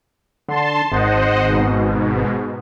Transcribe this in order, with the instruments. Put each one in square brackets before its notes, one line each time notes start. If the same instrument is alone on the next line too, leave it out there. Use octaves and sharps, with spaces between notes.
[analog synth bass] D3 [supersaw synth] A5 C6
[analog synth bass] G#1 [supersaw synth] C5 D#5 F#5
[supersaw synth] G#2 B2